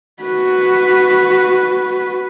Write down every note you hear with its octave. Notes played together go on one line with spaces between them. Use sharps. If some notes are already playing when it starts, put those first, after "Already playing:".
F#4 B4